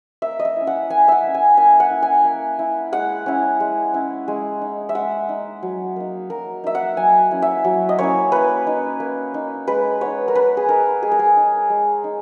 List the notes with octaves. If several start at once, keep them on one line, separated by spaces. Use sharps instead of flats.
A#3 E5
D#5
E5
C#4 E4
F#5
A#3 G#5
E5 F#5
C#4 E4
G#5
A#3 G#5
F#5
E4
G#5
A#3
E4
G#3 F#5
C#4 E4
G#3
C#4 E4
G#3
D#4
E5
G#3 F#5
D#4
F#3
A#3 D#4
F#3 A#4
A#3 D#4 E5
F#5
F#3 G#5
A#3 C#4 E4
E5
F#3
D#5
A#3 C#4 E4 C#5
A#3 B4
D#4
A#3
D#4
G#3 B4
B3 D#4 C#5
A#4
G#3 B4
G#4
B3 D#4 A#4
G#3 G#4
A#4
G#4
D#4
G#3
D#4